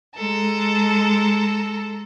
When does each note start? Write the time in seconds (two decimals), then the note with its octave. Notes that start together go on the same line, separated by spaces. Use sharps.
0.15 G#3 A4 A#5